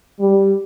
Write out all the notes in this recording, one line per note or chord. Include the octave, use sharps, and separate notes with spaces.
G3